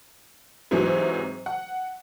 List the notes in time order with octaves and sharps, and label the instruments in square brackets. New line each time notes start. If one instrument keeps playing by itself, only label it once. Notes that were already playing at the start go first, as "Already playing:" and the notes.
[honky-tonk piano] G#2 C3 E3 F#3
F#5